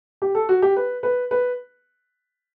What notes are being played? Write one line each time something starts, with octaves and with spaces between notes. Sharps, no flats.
G4
A4
F#4
G4
B4
B4
B4